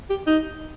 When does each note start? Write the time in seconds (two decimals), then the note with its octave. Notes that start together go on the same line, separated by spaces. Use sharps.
0.10 G4
0.27 D#4